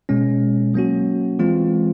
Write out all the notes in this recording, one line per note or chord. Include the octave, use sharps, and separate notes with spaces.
B2 G#3 C#4
F#3 A#3 C#4 F#4
E3 G#3 C4 F4